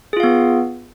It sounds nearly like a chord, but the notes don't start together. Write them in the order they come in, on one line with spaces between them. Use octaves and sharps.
G#4 F4 F5 B3